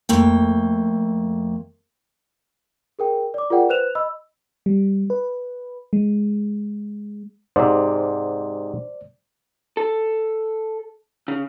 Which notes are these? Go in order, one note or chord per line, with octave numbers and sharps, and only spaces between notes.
F2 A3 A#3 G5
G#4 A#4 G5
D5 D6
F4 G#4 A#4 D5 F#5 G5
B4 C5 F#6 E7 F7
D#5 B5 E6
G3
B4
G#3
G#2 C3 C5 D5
A4
C#3